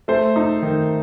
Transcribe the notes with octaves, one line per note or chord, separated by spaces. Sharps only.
A3 C5
D#4
D#3